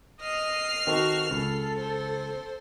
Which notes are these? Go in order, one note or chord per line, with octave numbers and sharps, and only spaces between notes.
D#5 F6 C7
D#3 C4 F#4 A4
C#2 A4
C5